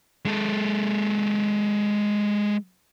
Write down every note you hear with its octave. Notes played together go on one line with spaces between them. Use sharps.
G#3 A4